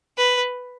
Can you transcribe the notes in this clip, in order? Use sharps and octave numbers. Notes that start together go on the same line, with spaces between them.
B4